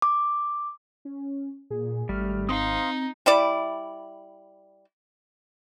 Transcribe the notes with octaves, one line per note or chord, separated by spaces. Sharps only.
D6
C#4
A#2 G#4
G#1 G3 A3 F6
C4 D#4 F5 C6 D#6
G3 E4 D5